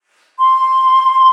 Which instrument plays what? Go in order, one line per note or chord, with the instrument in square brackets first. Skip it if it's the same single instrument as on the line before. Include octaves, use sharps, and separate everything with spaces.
[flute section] C6